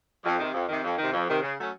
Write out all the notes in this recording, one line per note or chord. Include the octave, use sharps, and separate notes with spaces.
F2
C3 D#3
F2
C3 D#3
F2
C3 D#3
F2
C3 D#3
C#3
F#3 A3 C#4